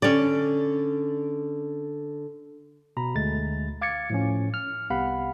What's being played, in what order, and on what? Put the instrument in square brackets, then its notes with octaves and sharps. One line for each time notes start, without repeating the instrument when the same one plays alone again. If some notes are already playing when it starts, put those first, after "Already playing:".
[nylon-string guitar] D3 G4 [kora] C#4 D5
[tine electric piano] B2 A#5 B5
D2 G#3 A3 A6
F5 D6 G#6 A6 C#7
A2 F3 C#4
F6
C2 B3 G4 F5 F#5 B5